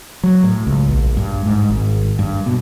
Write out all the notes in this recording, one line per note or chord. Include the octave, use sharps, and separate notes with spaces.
F#3
A2
C#2
A#1
G2
G#2
G#1
G2
B2